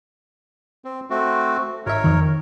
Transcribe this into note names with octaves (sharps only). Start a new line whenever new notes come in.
C4
A3 C4 F#4
G#1 A#4 C#5 E5
F2 D#3